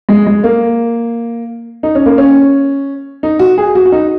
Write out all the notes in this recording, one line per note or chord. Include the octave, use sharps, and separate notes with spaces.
G#3
G#3
A#3
D#4
C#4
A#3
C#4
D#4
F#4
G#4
F#4
F#4
D#4